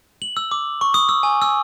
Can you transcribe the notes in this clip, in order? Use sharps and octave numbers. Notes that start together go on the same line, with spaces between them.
F#7
E6
D6
C#6
D#6
E6
G#5
E6